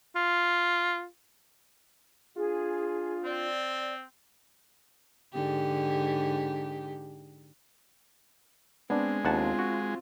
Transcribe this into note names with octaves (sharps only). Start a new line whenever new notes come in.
F4
D4 F4 G#4
C4 D5
G#2 D3 G4
G#3 B3 C4 D4
D#2 C4 F4 F#5 A5
F#4